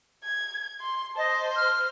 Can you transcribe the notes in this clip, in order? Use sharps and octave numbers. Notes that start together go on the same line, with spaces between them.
G#6
C6
C5 D#5 A5
F6